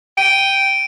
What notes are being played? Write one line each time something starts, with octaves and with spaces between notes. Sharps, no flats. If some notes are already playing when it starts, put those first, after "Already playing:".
G5 D7 D#7